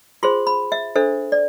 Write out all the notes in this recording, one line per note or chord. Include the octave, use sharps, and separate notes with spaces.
F4 G#4 C5 C6
B5
E5
D4 A4 C5 E5
D5